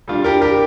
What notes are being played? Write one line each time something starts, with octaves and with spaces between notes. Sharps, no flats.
G3 D4 F4
G4 A#4
G4 A#4